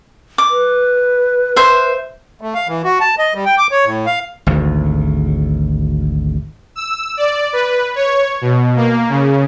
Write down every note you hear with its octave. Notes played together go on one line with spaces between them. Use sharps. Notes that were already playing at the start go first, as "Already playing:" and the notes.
D6
B4
C5 E5
A3
F5
E3
F#4
A5
D#5
G3
G5
D6
C#5
A2
F5
G#1 D2
E6
D5
B4
C#5
B2
A#3
C#3